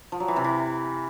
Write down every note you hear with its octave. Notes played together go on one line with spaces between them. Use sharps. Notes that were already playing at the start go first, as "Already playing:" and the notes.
F3
F#3
E3
C3
E3